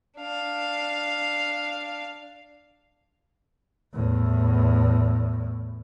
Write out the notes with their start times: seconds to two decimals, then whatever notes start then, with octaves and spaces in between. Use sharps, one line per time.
0.18 D4 F5
3.94 E2 A2